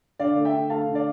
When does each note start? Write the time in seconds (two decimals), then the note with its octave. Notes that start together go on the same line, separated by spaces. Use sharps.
0.19 D3 D5 F5
0.36 A3
0.45 E5 G5
0.53 D3
0.70 A3 F5 A5
0.87 D3
0.95 D5 F5